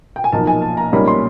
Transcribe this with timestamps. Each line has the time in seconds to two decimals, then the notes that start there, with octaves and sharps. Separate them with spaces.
0.16 G5
0.24 G#5
0.32 B1 A#2 F3 A#3 D#4 A5
0.47 G#5
0.62 A5
0.77 A#5
0.92 B1 A#2 G3 A#3 C#4 B5
1.08 C6